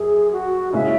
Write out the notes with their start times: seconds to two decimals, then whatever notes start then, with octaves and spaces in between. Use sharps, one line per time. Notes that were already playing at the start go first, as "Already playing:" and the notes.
Already playing: F#2 G#4
0.32 F#4
0.72 C#3 G#3 C#4 E4 E5